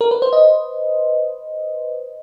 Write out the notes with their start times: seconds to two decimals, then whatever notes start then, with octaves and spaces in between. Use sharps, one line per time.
0.01 A#4
0.11 B4
0.22 C5
0.33 D#5